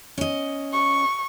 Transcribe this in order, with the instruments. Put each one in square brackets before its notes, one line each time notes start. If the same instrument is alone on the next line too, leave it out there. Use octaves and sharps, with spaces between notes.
[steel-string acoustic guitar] C#4 D#5
[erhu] C#6